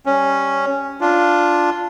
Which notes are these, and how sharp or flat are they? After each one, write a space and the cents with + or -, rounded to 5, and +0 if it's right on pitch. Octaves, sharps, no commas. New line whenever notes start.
G3 +0 C#4 +0
D4 +0 F4 +0